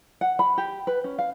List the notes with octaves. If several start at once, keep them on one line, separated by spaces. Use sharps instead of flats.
F#5
B5
G4
B4
C#4
F5